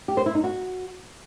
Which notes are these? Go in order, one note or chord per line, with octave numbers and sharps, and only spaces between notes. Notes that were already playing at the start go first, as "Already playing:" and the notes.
G4
C5
E4
D#4
F#4